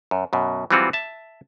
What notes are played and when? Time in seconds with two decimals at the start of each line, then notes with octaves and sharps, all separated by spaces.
0.11 F#2
0.33 F#2 B2
0.71 E3 F#3 G3 C4 F4 F#4
0.93 E5 A5